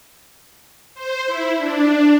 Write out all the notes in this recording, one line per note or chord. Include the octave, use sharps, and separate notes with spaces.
C5
E4
D4